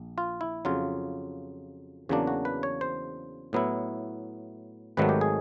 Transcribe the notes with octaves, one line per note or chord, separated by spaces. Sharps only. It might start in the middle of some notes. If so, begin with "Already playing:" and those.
Already playing: A#1
F4
E4
F2 C#3 F#3 F4
E2 C#3 F#3 A#3 D4
F#4
B4
C#5
C5
A2 F#3 B3 E4
G#1 G#2 D#3 F#3 A3 B4
G4
G#4